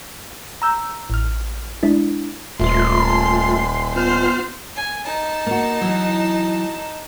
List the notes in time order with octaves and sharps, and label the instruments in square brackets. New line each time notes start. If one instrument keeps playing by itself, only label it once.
[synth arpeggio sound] A#5 E6 G6
A1 F6
G#3 D4 E4
[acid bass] D#1 [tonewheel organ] A3 F4 [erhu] C6
[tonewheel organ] B3 F4 F6 [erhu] C5
[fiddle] G#5
D#4 A5
[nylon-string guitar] A#3 F#4
E3 F#3